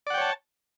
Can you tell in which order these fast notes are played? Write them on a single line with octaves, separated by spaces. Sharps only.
D5 F#5 G5 C#5 A5